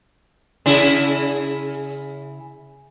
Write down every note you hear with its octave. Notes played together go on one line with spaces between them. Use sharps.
C#3 E4 G#4